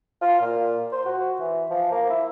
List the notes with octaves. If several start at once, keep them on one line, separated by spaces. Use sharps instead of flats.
F4
A#2
C5
F#4
E3
F3
A#3
E4